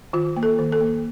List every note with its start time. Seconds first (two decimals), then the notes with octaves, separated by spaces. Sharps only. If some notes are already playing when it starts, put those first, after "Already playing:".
0.13 D#3 F4
0.36 A#3
0.43 A4
0.59 D#3
0.72 A4
0.80 A#3